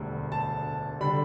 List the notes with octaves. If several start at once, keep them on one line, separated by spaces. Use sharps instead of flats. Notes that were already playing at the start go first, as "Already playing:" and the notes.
Already playing: E1 D2 D3 G3
A5
D3 G3 B5